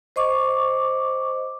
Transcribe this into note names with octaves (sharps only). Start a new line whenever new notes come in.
C5 D#5 C#6 D6